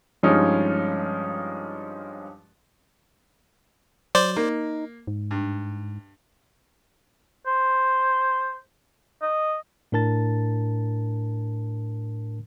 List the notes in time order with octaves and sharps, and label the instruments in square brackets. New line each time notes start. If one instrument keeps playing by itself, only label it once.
[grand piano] G2 F3 G#3 C#4 D#4 F4
[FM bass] F#3 [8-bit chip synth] C5 D5
[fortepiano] A#3 [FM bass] D#4
[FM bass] G#2
[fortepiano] G2
[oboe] C5
D#5
[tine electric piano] A2 D4 A#4 A5 A6